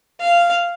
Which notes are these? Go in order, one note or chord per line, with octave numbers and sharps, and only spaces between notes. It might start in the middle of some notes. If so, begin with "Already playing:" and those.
F5